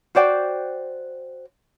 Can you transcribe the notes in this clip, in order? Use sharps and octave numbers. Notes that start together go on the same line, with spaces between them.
F#4 C5 D5 G5